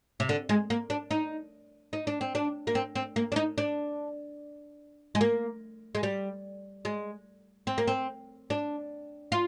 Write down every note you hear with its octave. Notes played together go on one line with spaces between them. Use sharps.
C3
D3
G#3
A#3
D4
D#4
D#4
D4
C4
D4
A#3
C4
C4
A#3
D4
D#4
D4
G#3
A#3
G#3
G3
G#3
C4
A#3
C4
D4
F4